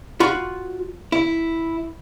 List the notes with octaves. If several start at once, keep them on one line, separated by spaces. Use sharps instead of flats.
F4 F#4 B5
E4